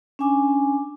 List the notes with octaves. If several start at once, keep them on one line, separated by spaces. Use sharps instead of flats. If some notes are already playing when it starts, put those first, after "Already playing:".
C#4 D4 G#5 D6